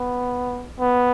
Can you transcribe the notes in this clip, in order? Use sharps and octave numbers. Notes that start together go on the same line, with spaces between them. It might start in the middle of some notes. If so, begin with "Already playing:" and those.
Already playing: B3
B3